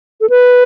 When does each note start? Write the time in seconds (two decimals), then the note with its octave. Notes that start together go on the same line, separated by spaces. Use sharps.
0.21 A4
0.30 B4